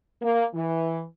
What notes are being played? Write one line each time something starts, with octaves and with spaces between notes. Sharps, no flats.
A#3
E3